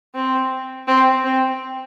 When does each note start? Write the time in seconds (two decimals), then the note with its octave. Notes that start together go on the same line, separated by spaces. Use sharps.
0.15 C4
0.87 C4
1.24 C4